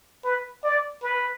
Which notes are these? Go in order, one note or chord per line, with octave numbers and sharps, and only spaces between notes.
B4
D5
B4